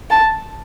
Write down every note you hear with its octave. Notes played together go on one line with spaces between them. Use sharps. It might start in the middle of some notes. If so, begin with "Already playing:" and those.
A5